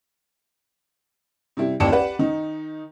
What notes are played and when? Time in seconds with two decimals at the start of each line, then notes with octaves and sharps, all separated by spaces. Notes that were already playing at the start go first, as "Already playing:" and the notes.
1.57 C3 G3 E4
1.80 A1 D#2 D5 A5 C#7 E7
1.92 G4 B4 D5 F#5
2.19 D#3 D#4